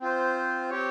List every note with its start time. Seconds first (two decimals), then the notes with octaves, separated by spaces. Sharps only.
0.01 C4 F4 C5
0.70 C4 G4 C#5